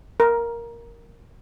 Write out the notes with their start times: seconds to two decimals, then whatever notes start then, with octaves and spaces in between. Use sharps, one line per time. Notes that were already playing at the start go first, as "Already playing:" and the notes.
0.20 A#4